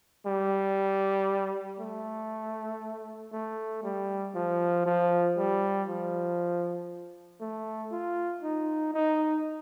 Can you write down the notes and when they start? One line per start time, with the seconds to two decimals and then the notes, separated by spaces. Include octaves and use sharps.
0.26 G3
1.79 A3
3.32 A3
3.83 G3
4.35 F3
4.86 F3
5.37 G3
5.88 F3
7.40 A3
7.92 F4
8.43 D#4
8.94 D#4